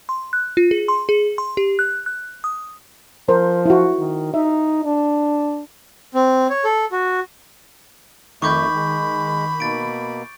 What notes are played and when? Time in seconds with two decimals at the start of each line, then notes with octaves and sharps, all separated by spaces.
0.09 C6
0.33 F#6
0.57 F4
0.71 G#4
0.88 C6
1.09 G#4
1.38 C6
1.57 G4
1.79 F#6
2.06 F#6
2.44 D#6
3.29 F3 A#4 C5
3.66 E4 F#4
3.99 D#3
4.34 D#4 E5
4.85 D4
6.14 C4
6.50 C#5
6.64 A4
6.92 F#4
8.42 F2 D#3 A3 B5 C#6 D6 G6
8.74 G#3
9.60 B2 A#3 A6 D7